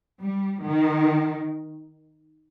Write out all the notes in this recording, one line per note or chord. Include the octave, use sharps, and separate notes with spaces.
G3
D#3